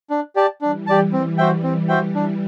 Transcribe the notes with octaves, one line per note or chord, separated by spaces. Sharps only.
D4
G4 D5 A5
E3 G3 D4
G4 D5 A5
E3 G3 C4
F#4 C5 E5 G5
E3 G3 C4
F#4 C5 E5 G5
D4